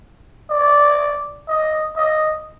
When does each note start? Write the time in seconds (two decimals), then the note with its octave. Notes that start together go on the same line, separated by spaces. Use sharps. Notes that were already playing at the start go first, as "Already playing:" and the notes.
0.50 D5
1.48 D#5
1.96 D#5